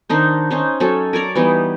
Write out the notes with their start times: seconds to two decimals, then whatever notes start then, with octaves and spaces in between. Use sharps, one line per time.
0.09 D#3 D4 D#4 C5
0.51 C#4 D#4 C5
0.80 F#3 C#4 A4
1.13 A#4 C#5 D5 A#5
1.35 E3 G3 B3 D#4